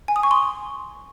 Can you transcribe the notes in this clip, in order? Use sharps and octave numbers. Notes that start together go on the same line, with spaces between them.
G#5
D#6
C#6
C6